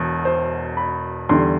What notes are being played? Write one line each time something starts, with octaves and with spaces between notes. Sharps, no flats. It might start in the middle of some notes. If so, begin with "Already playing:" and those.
Already playing: E1 E2 B2
C5
B5
E2 D3 G3 C6